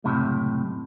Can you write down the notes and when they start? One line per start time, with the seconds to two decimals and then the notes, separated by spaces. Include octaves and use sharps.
0.04 C#2 F#2 A2 C3